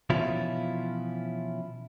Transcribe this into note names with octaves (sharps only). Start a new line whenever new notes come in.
B2 E3 F3 C#4 E4 F4